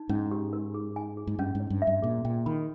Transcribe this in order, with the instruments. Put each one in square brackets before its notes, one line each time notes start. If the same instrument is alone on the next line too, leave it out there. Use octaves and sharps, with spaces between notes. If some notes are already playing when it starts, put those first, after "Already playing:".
Already playing: [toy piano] D#4
[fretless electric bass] G#2 [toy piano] C#4
[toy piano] G4
A#4
G#4
G#5
G#4
[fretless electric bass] G#2
[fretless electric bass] G2 [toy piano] C#4
[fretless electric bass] G#2
[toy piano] C#5
[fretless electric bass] G2
[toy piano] E5
[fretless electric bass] G2
[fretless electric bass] A#2 [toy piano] G#4
[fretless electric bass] A#2 [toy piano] G5
[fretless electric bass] D#3 [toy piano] B5